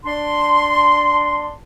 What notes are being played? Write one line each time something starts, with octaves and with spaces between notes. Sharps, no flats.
D4 C6